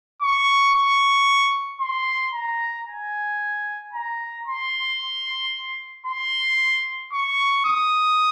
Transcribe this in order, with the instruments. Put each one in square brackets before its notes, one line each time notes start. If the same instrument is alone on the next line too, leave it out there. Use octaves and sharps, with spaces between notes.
[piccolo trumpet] C#6
C#6
C6
A#5
G#5
A#5
C6
C6
C#6
D#6